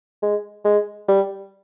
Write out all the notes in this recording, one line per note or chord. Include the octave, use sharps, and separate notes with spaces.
G#3
G#3
G3